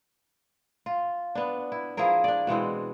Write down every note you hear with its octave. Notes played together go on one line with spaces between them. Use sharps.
F4
B3 D4
E4
F3 E4 G#4 A#4
D4 D5
B2 E3 G#3 C4